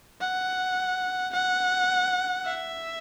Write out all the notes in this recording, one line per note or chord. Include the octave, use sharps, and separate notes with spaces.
F#5
F#5
E5